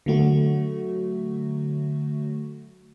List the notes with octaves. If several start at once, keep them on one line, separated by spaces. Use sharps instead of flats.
D3 F#3 A3 F#4